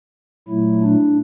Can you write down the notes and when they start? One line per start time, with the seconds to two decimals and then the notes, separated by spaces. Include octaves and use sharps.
0.48 A#2 F#3 A3 E4
0.82 D4